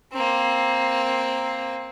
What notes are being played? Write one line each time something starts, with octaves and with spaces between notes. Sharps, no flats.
A#3 C4